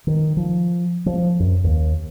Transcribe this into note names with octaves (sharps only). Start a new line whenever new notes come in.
D#3
F3
F3
F#2
D#2